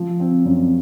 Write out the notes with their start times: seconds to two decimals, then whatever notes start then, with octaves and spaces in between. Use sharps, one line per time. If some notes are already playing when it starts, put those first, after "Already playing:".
Already playing: F3
0.20 C4
0.45 F#2